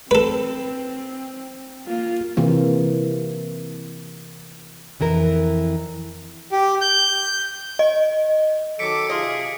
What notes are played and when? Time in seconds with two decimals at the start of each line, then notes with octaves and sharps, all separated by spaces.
0.11 C4 A4 B4
1.87 A#3 F4
2.37 C3 E3 A#3
5.00 F2 E3 E4 A#4
6.52 G4
6.81 G6
7.79 D#5
8.79 D#3 F#3 A4 D6 B6 C#7 D7
9.10 C3 F4 G#4 D#5